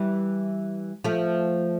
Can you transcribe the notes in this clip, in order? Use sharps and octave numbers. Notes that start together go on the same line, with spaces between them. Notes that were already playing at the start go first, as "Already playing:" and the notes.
Already playing: E3 G3
F3 A3